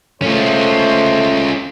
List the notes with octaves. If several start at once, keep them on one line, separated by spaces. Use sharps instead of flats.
A3 C#4 F4 C5